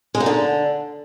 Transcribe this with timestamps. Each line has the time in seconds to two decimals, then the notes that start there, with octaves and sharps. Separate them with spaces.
0.15 G#3
0.20 D#4
0.26 D3